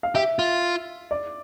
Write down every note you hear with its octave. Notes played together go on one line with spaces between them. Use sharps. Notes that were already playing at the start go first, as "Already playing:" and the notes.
F5
G4 E5
F4
D5